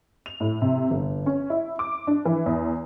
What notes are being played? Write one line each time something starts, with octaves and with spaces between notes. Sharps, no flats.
F7
A2
C3
G1
C#4
E4
D6
D4
E3
E2